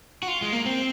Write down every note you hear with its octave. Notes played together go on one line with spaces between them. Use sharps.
F#4
F4
G#3
A#3
C4